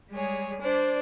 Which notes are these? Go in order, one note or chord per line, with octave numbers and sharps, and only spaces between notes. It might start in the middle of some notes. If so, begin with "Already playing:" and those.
G3 G#3 G#4 C#5
D4 C5 D5